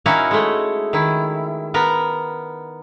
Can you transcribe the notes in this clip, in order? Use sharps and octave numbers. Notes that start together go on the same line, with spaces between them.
C#4 D#4 E4 F#4 A#4 F5
G#3 A3
D#3 E4
B3 A#4